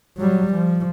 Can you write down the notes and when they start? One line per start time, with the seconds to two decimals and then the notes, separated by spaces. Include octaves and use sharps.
0.17 F#3 G3
0.53 F3